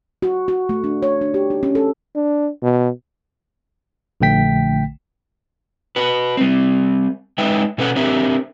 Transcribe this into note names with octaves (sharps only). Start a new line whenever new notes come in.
F#4
F#4
A3
D4
C#5
D4
G4
D#4
C#4
A4
D4
B2
A#1 D3 A3 G5 B6
F#4 B4
G3 C4
G#3 D#4 B4 E5 G5
B2 C#4 A4 B4 C5 F#5
C4 D4 G4 A#4 C5 E5